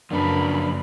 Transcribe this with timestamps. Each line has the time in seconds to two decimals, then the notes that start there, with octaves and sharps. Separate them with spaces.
0.11 F#2 C#3 F3 A#3 D4 A#4 B4 B5